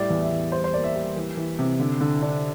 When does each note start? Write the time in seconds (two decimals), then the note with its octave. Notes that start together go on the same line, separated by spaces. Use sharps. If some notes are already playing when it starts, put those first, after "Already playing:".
Already playing: A2 G3 D5
0.10 E2
0.21 E5
0.31 E2
0.52 G3 C5
0.64 C5
0.73 A#3 D5
0.84 E5
0.95 G3
1.16 E3
1.37 E3
1.59 C3
1.79 D3
2.01 D3
2.22 D4